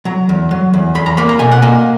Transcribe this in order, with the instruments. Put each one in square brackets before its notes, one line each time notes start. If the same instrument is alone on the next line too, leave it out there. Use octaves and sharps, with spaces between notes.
[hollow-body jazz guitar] F#3 A#5
E2
F#3
E2
E2 B5
A#5
A#3 B5
A#5
B2 G#5
F#5
A#3 G#5